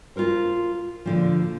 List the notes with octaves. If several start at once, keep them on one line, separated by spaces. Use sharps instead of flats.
F4 A4 A#4 C5
A#2 D3 F3